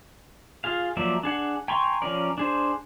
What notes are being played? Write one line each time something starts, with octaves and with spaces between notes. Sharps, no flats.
F4 G#4 F5
F3 F#3 A#3 D5 E5
D4 G#4 F#5
G5 G#5 A#5 C6 C#6
F3 C#4 A#4 D5
D4 G#4 C5